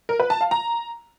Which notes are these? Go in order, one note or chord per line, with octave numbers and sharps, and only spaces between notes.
A#4
B4
A5
F5
A#5